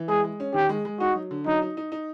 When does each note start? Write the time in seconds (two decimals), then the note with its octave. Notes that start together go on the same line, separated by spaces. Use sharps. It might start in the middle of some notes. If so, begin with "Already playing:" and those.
Already playing: E3
0.08 G#3 G#4
0.24 G#3
0.40 C#4
0.54 D#3 G4
0.69 G#3
0.85 G#3
1.00 D#4 F#4
1.15 F#3
1.31 D3
1.46 F#3 D#4
1.62 D#4
1.77 D#4
1.92 D#4